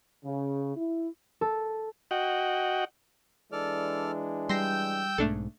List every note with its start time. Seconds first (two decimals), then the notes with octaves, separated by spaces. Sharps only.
0.25 C#3
0.76 E4
1.41 A4
2.11 F#4 D#5 F#5 G5
3.52 E3 G#3 D4 A4 D5 F6
4.49 G3 G5 C6 E6 G6 A#6 C7
5.18 B1 G#2 A3 D4 A4